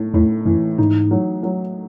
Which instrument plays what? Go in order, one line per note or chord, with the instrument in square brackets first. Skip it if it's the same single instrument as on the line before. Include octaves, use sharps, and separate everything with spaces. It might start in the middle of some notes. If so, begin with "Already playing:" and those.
Already playing: [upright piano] A2
[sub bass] E2 [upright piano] A2
[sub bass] F#2 [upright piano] E3
[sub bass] G#2 [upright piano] D#4
[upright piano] F#3
F#3